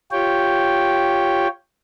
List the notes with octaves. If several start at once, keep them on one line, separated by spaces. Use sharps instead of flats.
F4 G4 C#5 G5